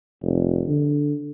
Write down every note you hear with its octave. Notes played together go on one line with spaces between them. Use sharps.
F1
D3